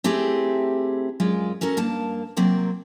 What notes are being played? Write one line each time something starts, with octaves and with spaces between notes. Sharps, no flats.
A3 C4 E4 G4 G#4
F#2 G#3 F4 D5
C#4 F#4 A4 A#4
G2 A#3 A5
C3 F#3 A#3 C4 D5